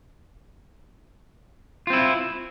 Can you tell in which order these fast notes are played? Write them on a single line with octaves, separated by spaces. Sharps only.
F4 C4 E4